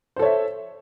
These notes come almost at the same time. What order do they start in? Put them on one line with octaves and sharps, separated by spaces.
C5 A4 C#5 E5